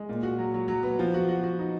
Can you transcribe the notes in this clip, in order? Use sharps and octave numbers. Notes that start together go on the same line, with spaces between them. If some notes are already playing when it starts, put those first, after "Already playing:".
Already playing: G#3
A#2
F#4
F#3
F#3
F#3
B3
F3
F#4
F#4
F#4
D#4